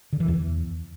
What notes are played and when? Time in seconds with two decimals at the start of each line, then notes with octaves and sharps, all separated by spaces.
0.13 D3
0.20 E3
0.28 E2